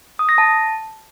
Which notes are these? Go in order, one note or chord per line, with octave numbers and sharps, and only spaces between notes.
D#6
A#6
A5